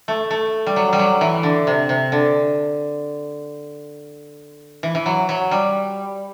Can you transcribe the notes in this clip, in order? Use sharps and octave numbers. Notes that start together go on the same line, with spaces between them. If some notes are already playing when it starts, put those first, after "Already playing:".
A3
A3
G3
F#3
G3
F#3
E3
D3
C3
C3
D3
E3
E3
F#3
F#3
G3